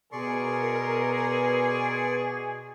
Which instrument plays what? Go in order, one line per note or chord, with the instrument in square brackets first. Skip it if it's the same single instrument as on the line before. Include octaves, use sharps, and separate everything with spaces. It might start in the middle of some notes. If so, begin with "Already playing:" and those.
[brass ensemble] B2 [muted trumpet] G#4 [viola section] A#4 [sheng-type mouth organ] D5 C6 C#6